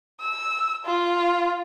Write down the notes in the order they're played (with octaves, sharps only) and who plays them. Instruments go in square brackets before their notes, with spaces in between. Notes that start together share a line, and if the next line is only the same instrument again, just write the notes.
[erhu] E6
F4